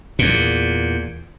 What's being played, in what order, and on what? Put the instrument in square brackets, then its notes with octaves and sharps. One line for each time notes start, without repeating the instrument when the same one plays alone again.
[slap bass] E2 A#2